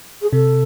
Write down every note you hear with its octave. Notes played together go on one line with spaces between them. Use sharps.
G#4
C3 A4